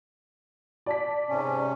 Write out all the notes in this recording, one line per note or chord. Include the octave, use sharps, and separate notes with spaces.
D5 A5 B6
G#2 C3 C#4